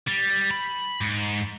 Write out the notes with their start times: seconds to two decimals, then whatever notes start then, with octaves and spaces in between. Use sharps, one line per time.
0.08 G3
0.51 B5
1.01 G#2